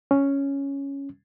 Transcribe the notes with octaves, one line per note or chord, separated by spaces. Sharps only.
C#4